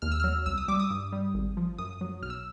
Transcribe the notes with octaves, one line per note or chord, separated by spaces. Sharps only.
D#2 F6
E6
F#3 F6
C2 E6
D#6
G3 D6
D#6
G2
G3
G#1
F3
F#2 D#6
F#3
B1 F6
E6